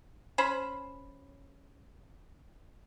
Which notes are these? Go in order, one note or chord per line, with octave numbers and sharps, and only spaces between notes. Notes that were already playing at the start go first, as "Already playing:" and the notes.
C#4 C5 B5